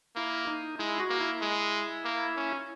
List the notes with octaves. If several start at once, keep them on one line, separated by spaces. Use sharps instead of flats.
A#3 E4
D#4
G#3 E4
F#4
A#3
E4
G#3
A#3
C#4